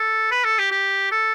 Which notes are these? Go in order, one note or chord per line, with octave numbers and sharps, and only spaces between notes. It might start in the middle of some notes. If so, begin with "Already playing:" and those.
Already playing: A4
B4
A4
G4
G4
A4